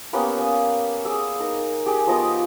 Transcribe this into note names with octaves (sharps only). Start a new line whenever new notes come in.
A#3 B3 C#4 G4
C#4 D#6
G#4 D6 E6
D#4 A#4
G4 G#4
F3 B3 D#5 D#6